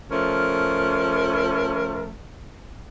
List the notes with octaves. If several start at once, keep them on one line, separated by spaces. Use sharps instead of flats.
F3 A3 C#4 A#4